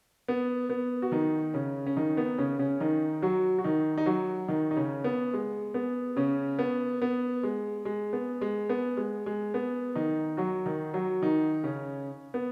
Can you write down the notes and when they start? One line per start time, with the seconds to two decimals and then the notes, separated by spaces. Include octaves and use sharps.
0.28 B3
0.70 B3
1.02 F#4
1.12 D#3 D#4
1.54 C#3 C#4
1.86 C#4
1.97 D#3 D#4
2.17 B3
2.38 C#3 C#4
2.59 C#3 C#4
2.80 D#3 D#4
3.22 F#3 F#4
3.58 F#4
3.64 D#3 D#4
3.98 D#4
4.06 F#3 F#4
4.48 D#3 D#4
4.71 D#4
4.76 C#3 C#4
5.04 B3
5.33 G#3
5.74 B3
6.16 C#3 C#4
6.59 B3
7.02 B3
7.43 G#3
7.85 G#3
8.13 B3
8.41 G#3
8.69 B3
8.97 G#3
9.26 G#3
9.54 B3
9.95 D#3 D#4
10.37 F#3 F#4
10.66 D#3 D#4
10.94 F#3 F#4
11.22 D#3 D#4
11.64 C#3 C#4
12.34 B3